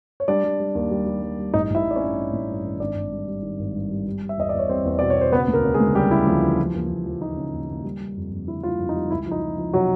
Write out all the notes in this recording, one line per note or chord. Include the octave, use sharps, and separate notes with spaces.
C#5
G3 D4 D5
G3
G3
D#2
G3
G3
G3
G3
A1 D#4 D#5
A1 E4 E5
G3
D5
C#4 C#5
G2
G2
A1
G2
D#3
G#1 D4 D5
G#1
G3
G3
D#3
G#1
G2
G3
G3
G3
E5
E2 D#5
E2 D5
C#5
G3 C4 C5
E2
B2 D5
C#5
B2 C5
C#3 B3 B4
D2
A#3 A#4
C#3
G#3 G#4
D2
C#3 G3 G4
C#3 E4
D2 F3 F4
E3
F3
D#2
D#2
F3
F3 D#4
C#3
D#2
D#2
G3
G3
F2
F2
D3 E4
G3 F4
E4
F2
D#4
G3
C#2 E4
F3
D#4
F3
F3
C3 F#3 F#4